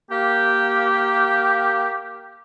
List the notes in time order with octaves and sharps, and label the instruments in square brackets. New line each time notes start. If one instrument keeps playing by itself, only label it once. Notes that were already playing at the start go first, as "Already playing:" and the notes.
[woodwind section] A#3 G4